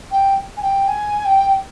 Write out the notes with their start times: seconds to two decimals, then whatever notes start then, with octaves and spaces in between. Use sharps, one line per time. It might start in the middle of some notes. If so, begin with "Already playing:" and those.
0.12 G5
0.57 G#5
0.62 G5
0.88 G#5
1.25 G5